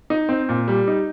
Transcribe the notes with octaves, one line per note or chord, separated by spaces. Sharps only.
D#4
C4
A#2
G3
D#4